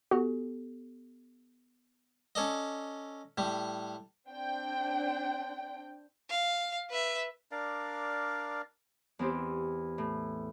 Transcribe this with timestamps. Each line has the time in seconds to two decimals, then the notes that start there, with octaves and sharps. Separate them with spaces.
0.11 B3 F#4 G4 A4
2.35 C#4 A4 D5 D#5
3.38 A2 G3
4.30 C4 D4 G5
6.30 F5
6.90 B4 E5
7.51 D4 A#4 D5 F5
9.19 E2 C4 G4 C5
9.98 A2